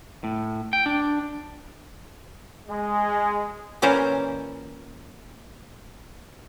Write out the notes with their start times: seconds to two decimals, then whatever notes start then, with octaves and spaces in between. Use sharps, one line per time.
0.24 A2
0.73 G5
0.86 D4
2.68 G#3
3.82 A#2 E3 C#4 A#4 C5 A5